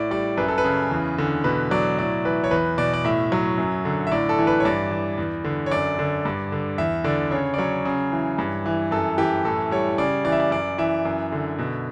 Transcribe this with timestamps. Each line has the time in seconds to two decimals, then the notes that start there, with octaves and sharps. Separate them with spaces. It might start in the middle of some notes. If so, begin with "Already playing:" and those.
Already playing: A2 D5
0.11 G3 D5
0.37 F#2 B4
0.48 A4
0.58 B4
0.64 C#3
0.91 E2
1.18 D3
1.44 B2 B4
1.71 F#3 D5
1.98 A2 D5
2.25 E3 B4
2.44 C#5
2.51 E2 B4
2.78 B2 D5
2.94 D5
3.05 A2 E5
3.32 F#3
3.58 F#2
3.85 D3
4.07 E5
4.12 A2 D5
4.29 A4
4.39 E3
4.47 B4
4.60 C#5
4.65 G2 D5
4.91 E3
5.18 E2
5.44 D3
5.66 C#5
5.71 F#2 D5
5.99 D3
6.25 G2
6.52 D3
6.78 E2 E5
7.04 D3 D5
7.31 C#3 C#5
7.54 D5
7.58 F#3 C#5
7.85 C#3
8.12 E3
8.38 G2
8.66 E3
8.91 F#2 A4
9.18 E3 G4
9.45 A2 A4
9.71 G3 C#5
9.98 C#3 D5
10.25 E3 D5
10.32 E5
10.40 D5
10.51 F#2 D5
10.78 E3 E5
11.05 F#2
11.32 D3
11.59 B2